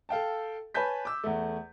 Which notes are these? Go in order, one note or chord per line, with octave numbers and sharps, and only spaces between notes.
A4 F5 G5 A5
B4 C#5 G#5 A5 G6 B6
D6 E6
E2 A3